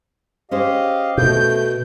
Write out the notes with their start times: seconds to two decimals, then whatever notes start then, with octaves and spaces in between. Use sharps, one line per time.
0.51 C#4 G4 G#4 C5 D#5 F5
1.18 B2 A3 G6